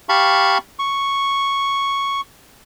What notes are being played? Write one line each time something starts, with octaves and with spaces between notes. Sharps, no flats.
G4 F5 A5 B5 C#6
C#6